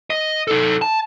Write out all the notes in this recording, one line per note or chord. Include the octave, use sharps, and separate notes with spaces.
D#5
D#4 A4
A5